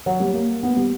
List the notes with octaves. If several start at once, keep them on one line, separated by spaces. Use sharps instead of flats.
F#3
G3
A#3
B3
G3